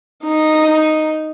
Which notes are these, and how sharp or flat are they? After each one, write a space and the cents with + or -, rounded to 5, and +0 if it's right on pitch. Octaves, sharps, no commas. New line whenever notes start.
D#4 -5